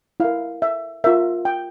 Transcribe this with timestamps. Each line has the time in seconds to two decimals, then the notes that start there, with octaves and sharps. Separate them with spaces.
0.20 E4 A#4 F5
0.62 E5
1.04 F4 A#4 E5
1.45 G5